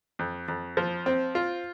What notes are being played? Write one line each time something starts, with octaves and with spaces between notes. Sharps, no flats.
F2
F2
F3
C4
F4